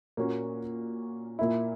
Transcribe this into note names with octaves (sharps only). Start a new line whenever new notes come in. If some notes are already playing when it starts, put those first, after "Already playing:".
A#2 A#3 C#4 F#4
A#2 A#3 E4